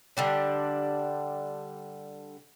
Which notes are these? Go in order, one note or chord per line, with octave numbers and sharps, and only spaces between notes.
D3 G3 D4